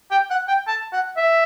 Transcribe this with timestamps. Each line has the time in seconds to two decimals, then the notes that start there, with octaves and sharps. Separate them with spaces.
0.11 G5
0.30 F#5
0.48 G5
0.67 A5
0.93 F#5
1.17 E5